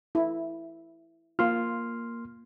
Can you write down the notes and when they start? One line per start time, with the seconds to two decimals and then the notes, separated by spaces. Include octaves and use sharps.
0.15 E4
1.39 A#3 F4 C6 F6